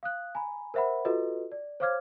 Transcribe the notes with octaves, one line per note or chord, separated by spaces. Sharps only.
F5 D#6 F#6
G#5 A#5 B5
A#4 C5 E5 F#5 B5
F4 F#4 A4 B4 D#5
D5
C5 C#5 F5 D6 F6 G#6